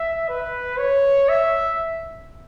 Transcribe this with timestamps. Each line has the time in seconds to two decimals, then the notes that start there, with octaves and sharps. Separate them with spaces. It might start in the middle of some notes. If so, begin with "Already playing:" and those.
Already playing: E5
0.28 B4
0.79 C#5
1.29 E5